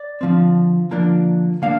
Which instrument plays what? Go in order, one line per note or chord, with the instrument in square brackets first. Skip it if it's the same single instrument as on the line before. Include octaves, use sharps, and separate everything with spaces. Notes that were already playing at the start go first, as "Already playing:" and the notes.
Already playing: [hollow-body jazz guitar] D5
D3 F3 C4
D3 F3 A#3 D4
D3 A#3 D4 F5